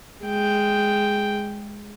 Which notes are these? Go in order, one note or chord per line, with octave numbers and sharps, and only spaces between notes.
G#3 G5